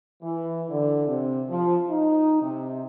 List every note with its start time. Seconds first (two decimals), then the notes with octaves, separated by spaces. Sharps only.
0.22 E3
0.70 D3
1.07 C3
1.49 F3
1.89 D#4
2.42 C3